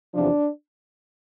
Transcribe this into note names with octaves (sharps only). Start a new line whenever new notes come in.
E2 C3 F3 D4